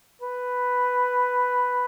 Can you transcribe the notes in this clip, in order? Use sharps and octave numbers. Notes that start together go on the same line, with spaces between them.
B4